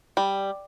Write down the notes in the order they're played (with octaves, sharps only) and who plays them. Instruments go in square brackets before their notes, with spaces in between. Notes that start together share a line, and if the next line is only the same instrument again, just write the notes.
[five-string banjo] G3